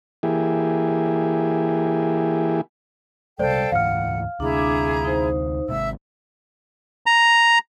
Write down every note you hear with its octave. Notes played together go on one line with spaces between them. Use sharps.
E3 A#3 E4 G4 G#4
C3 G3 G#3 A4 C5 D5 F5 G5
D2 G#2 E3 F5 F#5 F6
D2 C3 D4 E4 G#4 A#5 D6
D#4 C5
G#1 G#2 C3 E5 E6
A#5